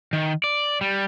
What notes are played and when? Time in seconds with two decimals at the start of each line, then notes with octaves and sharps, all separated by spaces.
0.13 D#3
0.44 D5
0.81 G3